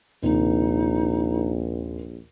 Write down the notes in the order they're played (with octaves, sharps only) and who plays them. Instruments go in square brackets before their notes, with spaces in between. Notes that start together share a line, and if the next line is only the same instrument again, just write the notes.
[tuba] A#1 [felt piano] D#2 C3 D#3 [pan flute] D#4